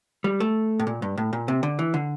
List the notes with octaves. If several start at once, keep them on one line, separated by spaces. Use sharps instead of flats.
G3
A3
A2
A#2
G2
A2
A#2
C3
D3
E3
D3